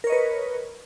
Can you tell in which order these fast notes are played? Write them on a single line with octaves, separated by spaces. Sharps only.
A#4 C#5 D#5 B4